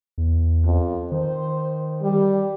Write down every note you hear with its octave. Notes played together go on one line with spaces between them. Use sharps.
E2
F2
D#3 C5
G3